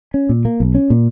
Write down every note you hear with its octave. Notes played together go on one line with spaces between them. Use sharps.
C#4
A#2
A#3
B1
C#4
A#2